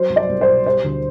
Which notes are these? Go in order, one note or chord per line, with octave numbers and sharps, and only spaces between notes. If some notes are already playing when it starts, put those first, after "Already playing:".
Already playing: F#3 C5
C2
D5
C2
C5
B2
G3 C5
D2